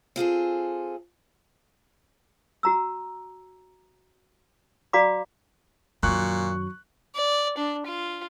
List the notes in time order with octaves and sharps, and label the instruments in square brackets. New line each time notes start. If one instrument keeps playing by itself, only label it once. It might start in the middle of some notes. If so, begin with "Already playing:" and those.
[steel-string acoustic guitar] C4 F4 G#4 A4
[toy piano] F#4 A#5 E6
F#4 D5 F5 A#5 B5 D6
[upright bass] F#2 D#3 [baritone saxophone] A#2 [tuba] F#3 [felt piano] C#6 F#6
[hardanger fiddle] D5
D4
F4